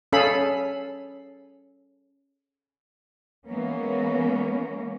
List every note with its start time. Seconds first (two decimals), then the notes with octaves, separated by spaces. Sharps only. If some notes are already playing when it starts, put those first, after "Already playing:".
0.13 C#4 G#4 A4 F5 B5
3.47 E3 G#3 A#3 B3 C#4